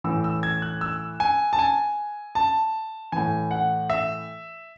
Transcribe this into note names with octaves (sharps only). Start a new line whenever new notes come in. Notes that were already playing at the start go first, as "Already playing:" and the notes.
A2 E3 E6
E6
G#6
F#6
E6
G#5
A5
G#5
A5
A2 E3 G#5
F#5
E5